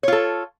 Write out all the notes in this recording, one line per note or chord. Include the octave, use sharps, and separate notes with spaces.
F4 A4 C#5